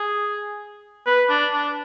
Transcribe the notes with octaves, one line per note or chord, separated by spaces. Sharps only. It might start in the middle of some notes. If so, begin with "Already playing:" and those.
Already playing: G#4
B4
D4
D4